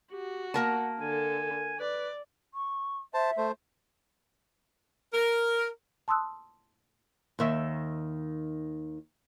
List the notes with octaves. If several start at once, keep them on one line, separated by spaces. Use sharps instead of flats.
F#4 G4
A#3 A#4 F#5 A5
D3 A4 G#5
B4 D5
C#6
C5 E5 A5
A3 C5
A#4
A5 C6 D#6 E6 F#6
D#2 D#3 E5